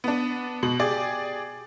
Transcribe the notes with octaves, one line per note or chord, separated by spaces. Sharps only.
B3 D4
B2 F#7
G4 G#4 D5